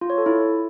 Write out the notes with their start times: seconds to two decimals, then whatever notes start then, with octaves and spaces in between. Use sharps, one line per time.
0.01 F4
0.10 C#5
0.18 A4
0.26 E4